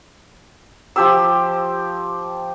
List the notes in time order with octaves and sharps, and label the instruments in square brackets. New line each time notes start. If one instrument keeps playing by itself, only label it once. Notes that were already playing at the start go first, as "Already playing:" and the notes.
[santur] F3 G4 E6